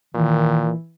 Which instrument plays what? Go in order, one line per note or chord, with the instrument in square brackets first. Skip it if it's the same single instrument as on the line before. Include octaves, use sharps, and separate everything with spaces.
[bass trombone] A#2 [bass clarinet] D#3 [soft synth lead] E3